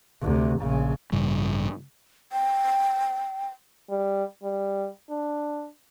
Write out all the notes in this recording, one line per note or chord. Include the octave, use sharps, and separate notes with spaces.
D2 C3
A#1 C#3
A1 G2 C#3 G3
G5
G3
G3
D4